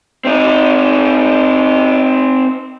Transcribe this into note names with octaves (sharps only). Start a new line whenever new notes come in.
C4 D#4